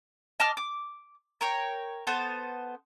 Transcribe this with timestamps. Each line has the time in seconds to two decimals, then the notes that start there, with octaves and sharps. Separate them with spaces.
0.40 D#5 A5 D6 F6
0.57 D6
1.41 A#4 C#5 G5
2.07 B3 A4 C5